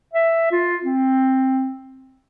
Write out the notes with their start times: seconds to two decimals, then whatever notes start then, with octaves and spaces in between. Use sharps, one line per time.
0.13 E5
0.52 F4
0.84 C4